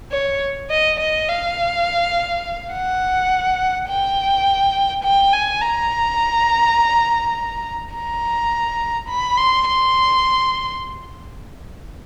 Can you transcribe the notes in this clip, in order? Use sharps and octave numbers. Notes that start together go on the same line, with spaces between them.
C#5
D#5
D#5
F5
F#5
G5
G5
G#5
A#5
A#5
B5
C6
C6